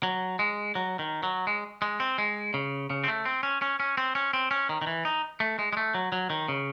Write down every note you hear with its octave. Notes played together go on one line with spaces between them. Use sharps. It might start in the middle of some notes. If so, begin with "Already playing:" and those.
F#3
G#3
F#3
D#3
F#3
G#3
G#3
C4
G#3
C#3
C#3
C4
A3
C4
C#4
C#4
C#4
C4
C#4
C4
C#4
D#3
D#3
E3
D#4
A3
G#3
G#3
A3
F#3
F#3
D#3
C#3